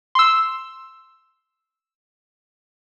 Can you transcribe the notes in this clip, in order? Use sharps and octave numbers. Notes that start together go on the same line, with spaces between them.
C6 E6